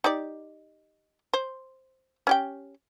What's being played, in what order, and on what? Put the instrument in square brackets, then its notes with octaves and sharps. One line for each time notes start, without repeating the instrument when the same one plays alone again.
[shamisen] D#4 G4 D5
C5
C#4 G4 G5